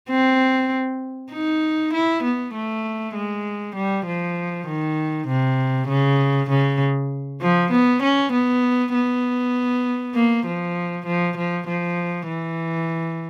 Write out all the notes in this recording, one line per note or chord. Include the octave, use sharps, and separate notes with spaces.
C4
D#4
E4
B3
A3
G#3
G3
F3
D#3
C3
C#3
C#3
F3
B3
C#4
B3
B3
A#3
F3
F3
F3
F3
E3